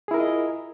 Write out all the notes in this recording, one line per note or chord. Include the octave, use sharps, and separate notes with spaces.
E4 F4 G#4 A#4 D#5